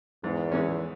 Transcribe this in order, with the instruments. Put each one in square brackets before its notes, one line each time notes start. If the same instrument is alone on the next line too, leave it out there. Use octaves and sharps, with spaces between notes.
[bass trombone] E2 [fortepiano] G#2
[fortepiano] E3 G#3 C#4